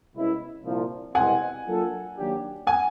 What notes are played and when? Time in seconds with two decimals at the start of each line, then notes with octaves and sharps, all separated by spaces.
0.14 C2 B2 G#3 C#4 E4
0.64 C2 A#2 F3
1.15 C2 B2 G#3 C4 F#5 G#5
1.66 F#3 A#3 D4 F4 A4
2.16 D#3 F#3 A#3 D4 G4
2.67 F#5 G#5